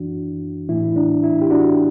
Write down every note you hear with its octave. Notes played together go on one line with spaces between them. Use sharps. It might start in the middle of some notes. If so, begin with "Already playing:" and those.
Already playing: F#2 E3 D4 F#4
A2 E3 E4
D4
E4
G4
D4 F#4